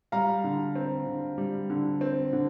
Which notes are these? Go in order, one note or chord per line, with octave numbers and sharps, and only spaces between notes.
G3 F5 A#5
D3
C4
D3
G3
D3
C4
D3